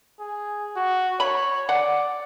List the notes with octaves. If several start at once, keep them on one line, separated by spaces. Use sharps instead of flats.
G#4
F#4
C#5 B5
D5 F#5